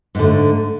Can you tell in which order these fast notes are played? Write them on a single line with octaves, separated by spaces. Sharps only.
G#2 D3 A3